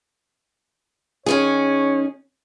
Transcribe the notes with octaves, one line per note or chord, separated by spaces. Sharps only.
D#3 C#4 G#4 C#5